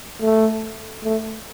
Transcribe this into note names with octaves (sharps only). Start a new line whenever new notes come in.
A3
A3